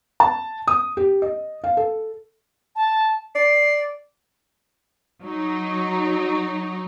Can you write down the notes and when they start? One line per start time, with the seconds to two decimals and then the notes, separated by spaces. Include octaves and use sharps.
0.20 A5
0.67 D#6
0.97 G4
1.22 D#5
1.64 F5
1.77 A4
2.76 A5
3.35 D5 C7
5.23 F#3 D#4